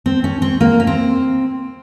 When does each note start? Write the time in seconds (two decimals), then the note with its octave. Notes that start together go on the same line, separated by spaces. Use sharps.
0.06 C4
0.24 C#4
0.42 C4
0.61 A#3
0.80 C#4
0.87 C4